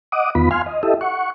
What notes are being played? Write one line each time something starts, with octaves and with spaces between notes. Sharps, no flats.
D#5 F#5 D6 D#6
E2 D#3 B3 F4 B5
F5 G#5 C6 F6
D#5
E4 G4 A4 D#5 E5
F#5 C#6